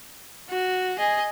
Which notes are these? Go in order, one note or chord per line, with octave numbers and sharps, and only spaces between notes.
F#4
G#4 D#5